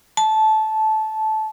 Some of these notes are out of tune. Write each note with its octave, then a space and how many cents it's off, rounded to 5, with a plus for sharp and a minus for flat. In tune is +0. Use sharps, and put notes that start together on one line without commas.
A5 -15